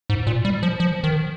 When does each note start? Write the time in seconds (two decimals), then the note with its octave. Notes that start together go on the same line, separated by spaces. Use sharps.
0.10 G#2
0.27 A#2
0.45 G3
0.63 F3
0.80 F3
1.04 D#3